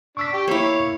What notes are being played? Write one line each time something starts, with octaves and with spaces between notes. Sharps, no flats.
D4 C#6 E6 B6
G4 G5
A#3 E4 C#5 F5